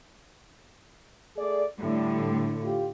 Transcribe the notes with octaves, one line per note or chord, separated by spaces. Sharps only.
A3 G#4 D5
A2 D3 G3
F4 G4